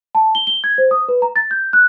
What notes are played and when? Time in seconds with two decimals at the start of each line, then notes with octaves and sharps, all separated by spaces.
0.15 A5
0.35 G7
0.47 G7
0.64 G#6
0.78 C5
0.91 D#6
1.08 B4
1.22 A#5
1.36 A6
1.51 G6
1.73 F#6